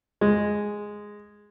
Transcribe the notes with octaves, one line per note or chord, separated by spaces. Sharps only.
G#3